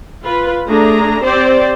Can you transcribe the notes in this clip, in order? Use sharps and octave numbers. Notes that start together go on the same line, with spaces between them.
F4 B4
A3 D4 G#4 A#5
C4 G4 C5 D5